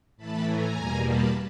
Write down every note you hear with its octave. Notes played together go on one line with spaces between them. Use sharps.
A2 E3 A3 A5 B5
G#5 A#5
E2 B2 G3 A#3
A5 B5